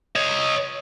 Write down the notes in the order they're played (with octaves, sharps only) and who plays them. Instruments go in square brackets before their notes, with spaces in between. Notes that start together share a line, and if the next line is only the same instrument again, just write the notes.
[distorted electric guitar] C#5 D#5